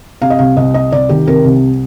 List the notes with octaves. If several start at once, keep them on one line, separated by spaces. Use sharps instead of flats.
C3 F5
D#5
C2 F5
C2 D#5
C3 D#5
C2 D5
D#3 G4
C3 A#4
C2